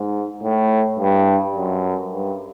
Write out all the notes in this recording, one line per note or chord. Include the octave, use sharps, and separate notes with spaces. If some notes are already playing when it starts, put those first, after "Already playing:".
Already playing: G#2
A2
G2
F#2
G2